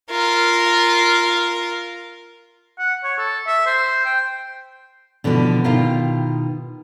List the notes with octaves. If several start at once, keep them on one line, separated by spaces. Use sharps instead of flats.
F4 A#4
F#5
C#5
A4
E5
C5
G5
B2 D3 E3 F3 F#4 G4
B2 D#3 E4 F4 G4 A#4